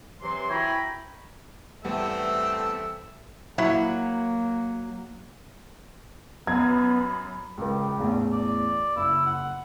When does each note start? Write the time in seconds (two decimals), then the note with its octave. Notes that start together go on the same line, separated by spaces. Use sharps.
0.22 C3 E3 F#3 C6
0.50 E4 F#4 G5 G#5 A#5 B5
1.85 E2 G3 A3 B3 C4 A4 E5
3.58 F#3 A#3 E4 C#5 F#5
6.47 F#2 B3 B5 G#6
7.57 C#2 G3 A#4
7.98 A1 E2
8.32 D5
8.96 F#1 E4
9.26 F#5